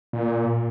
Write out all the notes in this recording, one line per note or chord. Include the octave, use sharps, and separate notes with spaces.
A#2